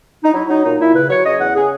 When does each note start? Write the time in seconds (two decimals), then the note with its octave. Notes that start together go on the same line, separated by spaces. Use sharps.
0.24 D#4
0.33 F#3 E4
0.49 F#3 D#4
0.64 A#2 D#4
0.79 A#2 E4
0.94 C#3 B4
1.09 F#3 C#5
1.24 C#3 D#5
1.39 E2 F#5
1.55 C#3 G#4